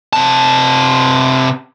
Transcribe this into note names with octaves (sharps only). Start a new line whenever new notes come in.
C3 A5